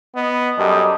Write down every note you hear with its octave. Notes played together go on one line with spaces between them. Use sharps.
B3 D#5
F#2 G3 G4 A4 D#5